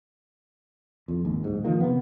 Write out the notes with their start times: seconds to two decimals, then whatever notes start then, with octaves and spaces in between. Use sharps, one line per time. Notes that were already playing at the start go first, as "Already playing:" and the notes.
1.08 F2
1.25 G#1 D#2
1.44 D1 G#2
1.64 D#3 F3 A#3
1.80 C3 B3